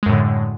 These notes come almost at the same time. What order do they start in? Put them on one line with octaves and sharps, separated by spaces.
G#3 F#2 A2 D3